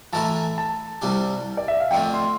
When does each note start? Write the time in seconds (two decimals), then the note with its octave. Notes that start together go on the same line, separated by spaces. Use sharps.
0.13 E3 A3 E4 A#4 E5 A5
0.58 A5
1.02 C2 C3 G3 D4
1.57 D5
1.68 E5
1.80 F5
1.91 F2 D3 A3 C4 G5
2.14 C6